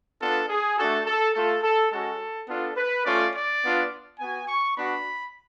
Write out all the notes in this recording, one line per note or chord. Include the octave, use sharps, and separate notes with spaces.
B3 D4 F4 A4
G#4
A3 D4 F#4 A4
A4
A3 F4 A4
A4
G#3 C#4 F#4 A4
B3 D4 F4 A4
B4
A3 C#4 F4 D5
D5
B3 D4 F4
B3 F#4 G#5
C#6
B3 D4 F#4 B5